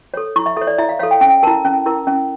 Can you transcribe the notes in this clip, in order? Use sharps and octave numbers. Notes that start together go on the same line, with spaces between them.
A4 C#5
E4 C#6
E5
A4 C#5 E5
D5
E4 E5
F5
A4 C#5 F5
G5
C#4 G5
E4 A#4 A5
C#4
E4 A#4
C#4